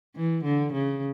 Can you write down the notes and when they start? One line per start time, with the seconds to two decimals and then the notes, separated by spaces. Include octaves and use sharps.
0.15 E3
0.44 D3
0.73 C#3